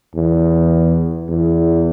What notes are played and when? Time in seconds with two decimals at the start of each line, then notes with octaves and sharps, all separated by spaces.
0.15 E2
1.29 E2